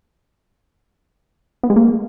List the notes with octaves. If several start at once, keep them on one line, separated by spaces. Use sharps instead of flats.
B3
G#3
A#3